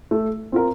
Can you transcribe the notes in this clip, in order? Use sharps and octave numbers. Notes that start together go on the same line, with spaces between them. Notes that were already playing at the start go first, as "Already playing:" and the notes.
A3
C4 F4 A#4